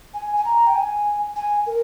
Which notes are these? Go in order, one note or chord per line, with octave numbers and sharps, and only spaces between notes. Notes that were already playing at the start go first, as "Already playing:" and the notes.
G#5
G#5
A#5
G5
G#5
G#5
A#4